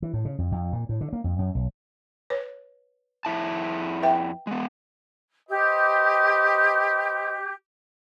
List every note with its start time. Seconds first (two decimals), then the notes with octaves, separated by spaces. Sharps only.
0.02 E3
0.14 A2
0.25 C#3
0.38 F2
0.52 F2
0.73 A#2
0.89 A2
1.01 D3
1.13 A#3
1.24 F2
1.39 F#2
1.55 B1
2.30 B4 C#5
3.25 F2 E4 A5
4.02 B4 E5 G5
4.47 G#3 B3
5.50 G4 B4 C5 D#5